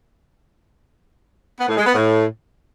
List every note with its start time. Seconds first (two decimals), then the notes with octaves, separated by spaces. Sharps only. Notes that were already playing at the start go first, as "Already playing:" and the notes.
1.60 B3
1.68 A2
1.77 G#3
1.86 B3
1.94 A2